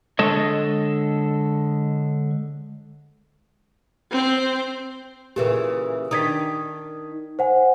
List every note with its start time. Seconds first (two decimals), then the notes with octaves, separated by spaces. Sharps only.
0.19 D3 G#3 A4 C#5 D#5
4.11 C4 C5
5.36 A#2 C#3 E3 G4 A#4 B4
6.11 D#3 D4 D#4 D#6 G#6 B6
7.39 C5 F#5 G#5